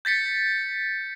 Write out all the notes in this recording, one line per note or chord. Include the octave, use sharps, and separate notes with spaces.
G6 A6 B6 C#7